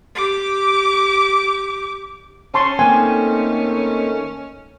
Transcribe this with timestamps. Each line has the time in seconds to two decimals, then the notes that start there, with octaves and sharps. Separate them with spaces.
0.15 G4 D6
2.54 C#4 A5 C6 C#6
2.79 D#3 A3 A#3 C4 D#4 G#5